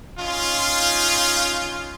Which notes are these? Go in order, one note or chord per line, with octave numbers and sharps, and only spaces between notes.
C#4 D#4 F4